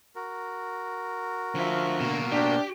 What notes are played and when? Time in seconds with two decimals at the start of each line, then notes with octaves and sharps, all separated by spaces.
0.16 F#4 A#4
1.55 D3 F3 E5
2.01 B2 A#3
2.32 D4 G4 G5